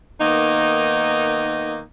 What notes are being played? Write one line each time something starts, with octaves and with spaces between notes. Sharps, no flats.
D#3 A#3 B3 D#4